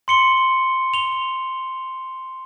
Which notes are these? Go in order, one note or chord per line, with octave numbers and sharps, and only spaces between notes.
C6 C#7 G7
F7 G7